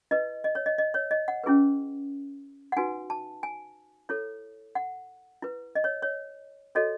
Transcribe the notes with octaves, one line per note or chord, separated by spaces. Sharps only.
E4 B4 D#5
D#5
C#5
D#5
D#5
C#5
D#5
F#5
C#4 E4 G#4 B4
F#5
D#4 F#4 B4 G#5
A5
G#5
E4 A4 C#5
F#5
E4 B4
D#5
C#5
C#5
F#4 A4 C#5 D#5